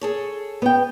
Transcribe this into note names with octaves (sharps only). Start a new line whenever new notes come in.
G#4 A4 C#5
B3 G5